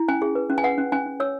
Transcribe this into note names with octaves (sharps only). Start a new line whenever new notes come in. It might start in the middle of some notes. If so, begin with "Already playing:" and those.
Already playing: E4
C#4 G#5
G#4
B4
C#4
G#5
B4 F#5
C#4
C#4 G#5
C#4
C#5 E6